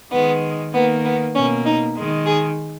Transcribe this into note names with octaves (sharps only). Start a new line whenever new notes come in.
D#3 G#3 B3
D#3 A#3 B3
B3
B2 A#3 C#4
D#4
D#3 G#3
G#4